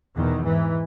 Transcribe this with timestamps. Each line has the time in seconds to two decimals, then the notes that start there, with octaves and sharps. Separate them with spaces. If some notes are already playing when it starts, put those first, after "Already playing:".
0.16 E2 B2 D#3
0.43 G#2 E3